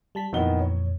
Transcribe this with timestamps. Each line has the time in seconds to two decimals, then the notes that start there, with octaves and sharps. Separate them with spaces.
0.15 G3 A5 B6
0.33 F2 A#2 D#3 E3 B3 G7
0.59 C#5